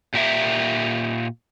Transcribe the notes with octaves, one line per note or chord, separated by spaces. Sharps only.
A#2 G4 A#4 E5